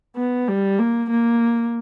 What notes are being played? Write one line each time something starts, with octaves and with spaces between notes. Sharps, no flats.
B3
G3
A#3
A#3